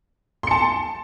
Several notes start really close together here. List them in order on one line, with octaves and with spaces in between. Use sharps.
C6 C#7 A5